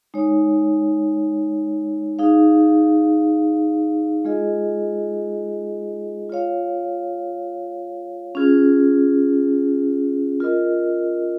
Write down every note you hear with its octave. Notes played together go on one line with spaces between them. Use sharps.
G#3 D#4 C#5
D#4 G#4 F5
G#3 F4 G#4 D#5
F4 C#5 F5
C#4 F4 G#4
F4 A#4 D#5